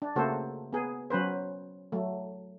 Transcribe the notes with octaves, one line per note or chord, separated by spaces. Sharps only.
D4
C#3 A3 A#3 F#4 A4 C5
B3 G#4
F#3 C#4 B4 C5
F#3 A3